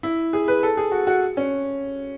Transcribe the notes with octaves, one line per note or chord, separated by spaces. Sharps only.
E4
G#4
B4
A4
G#4
F#4
F#4
C#4